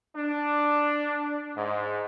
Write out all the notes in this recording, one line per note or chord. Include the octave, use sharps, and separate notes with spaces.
D4
G#2